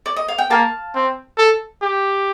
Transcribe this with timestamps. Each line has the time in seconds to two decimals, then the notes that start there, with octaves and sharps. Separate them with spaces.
0.06 D5
0.17 D#5
0.28 F5
0.38 G5
0.50 A#3 F5 A5
0.95 C4
1.38 A4
1.82 G4